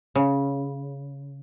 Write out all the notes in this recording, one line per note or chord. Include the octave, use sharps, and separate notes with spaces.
C#3